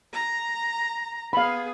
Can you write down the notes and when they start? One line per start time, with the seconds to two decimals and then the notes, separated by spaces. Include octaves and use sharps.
0.13 A#5
1.33 B3 G#4 F5 B5